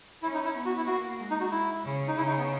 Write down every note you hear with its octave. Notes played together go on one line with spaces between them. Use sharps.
C#4 E4
D#4
E4
B3
F#4
E4
A#3 F#4
G#3
D#4
F#4
E4
C#3
D#4
C#3 E4
D#4
B3